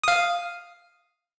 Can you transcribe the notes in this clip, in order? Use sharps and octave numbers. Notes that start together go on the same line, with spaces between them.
F5 D#6